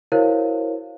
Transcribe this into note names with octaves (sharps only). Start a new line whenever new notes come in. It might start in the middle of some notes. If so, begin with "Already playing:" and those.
E4 F#4 A#4 C5 C#5 F5